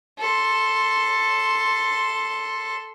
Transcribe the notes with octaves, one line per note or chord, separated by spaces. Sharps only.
A4 C6